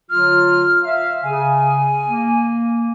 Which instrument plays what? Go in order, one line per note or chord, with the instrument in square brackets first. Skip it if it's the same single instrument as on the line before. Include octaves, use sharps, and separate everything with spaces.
[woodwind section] D3 F#3 F4 [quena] F6
[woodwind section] E5 F5
[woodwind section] C#3 [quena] G#5
[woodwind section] A#3